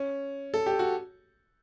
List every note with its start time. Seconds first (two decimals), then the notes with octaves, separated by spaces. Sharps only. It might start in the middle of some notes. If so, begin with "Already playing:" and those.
Already playing: C#4
0.54 A4
0.66 G4
0.79 F#4